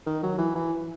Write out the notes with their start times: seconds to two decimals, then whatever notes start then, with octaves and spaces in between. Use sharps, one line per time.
0.06 D#3
0.23 F#3
0.38 E3
0.55 E3